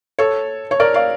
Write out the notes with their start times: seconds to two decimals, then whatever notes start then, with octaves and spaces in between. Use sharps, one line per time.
0.19 A4 C#5
0.71 C#5
0.80 A#4 D5
0.94 D5 F5